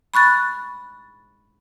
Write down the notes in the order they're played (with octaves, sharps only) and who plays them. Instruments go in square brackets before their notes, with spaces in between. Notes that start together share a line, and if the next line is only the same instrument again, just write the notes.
[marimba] B5 C#6 F#6 A6